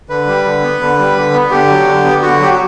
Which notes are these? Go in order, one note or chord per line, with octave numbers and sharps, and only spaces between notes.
D3 B4
G3
D3
B3
D3
G3
D3
B3
D3 G4
F#3
D3
B3
D3 F#4
F#3 G4
F#4